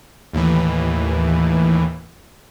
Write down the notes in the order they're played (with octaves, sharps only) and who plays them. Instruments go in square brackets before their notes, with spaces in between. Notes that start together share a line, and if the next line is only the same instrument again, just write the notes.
[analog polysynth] D#2 A2 E3